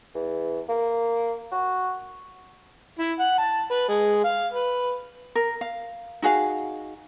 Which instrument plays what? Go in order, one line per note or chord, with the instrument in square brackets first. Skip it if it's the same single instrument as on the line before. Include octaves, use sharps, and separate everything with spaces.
[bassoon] E2
A#3
F#4
[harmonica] E4
F#5
A5
B4
G#3
F5
B4
[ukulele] A#4
F5
D#4 F#4 G#4 F5